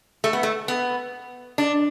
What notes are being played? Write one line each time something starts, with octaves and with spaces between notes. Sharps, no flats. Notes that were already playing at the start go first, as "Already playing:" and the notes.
A3
B3
A3
B3
D4